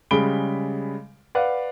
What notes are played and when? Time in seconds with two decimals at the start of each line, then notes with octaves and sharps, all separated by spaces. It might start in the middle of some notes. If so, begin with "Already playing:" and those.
0.11 C#3 G3 G#3 B5 D7 G7
1.35 B4 D5 F5 F#5